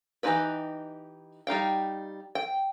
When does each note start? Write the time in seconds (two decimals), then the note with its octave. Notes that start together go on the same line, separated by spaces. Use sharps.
0.23 E3 F3 D#4 G4 B4
1.47 G3 D#4 F5 G5
2.35 G5